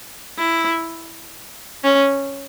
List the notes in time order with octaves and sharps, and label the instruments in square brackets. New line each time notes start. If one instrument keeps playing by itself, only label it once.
[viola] E4
C#4